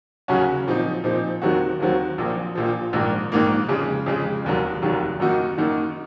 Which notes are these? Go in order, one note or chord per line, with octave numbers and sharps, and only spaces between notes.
D#2 C#3 F#3 C#4 F#4
A#2 F3 C4 D#4
A#2 F3 C4 D#4
D#2 D#3 F#3 C4 F#4
D#2 D#3 F#3 C4 F#4
A#1 A#2 F3
A#1 A#2 F3
A#1 G#2 D#3 A#3
A#1 G#2 D#3 A#3
F2 C#3 G#3
F2 C#3 G#3
F1 D#2 D#3 F#3
F1 D#2 D#3 F#3
F#2 D#3 A#3 D#4 F#4
F#2 D#3 A#3 D#4 F#4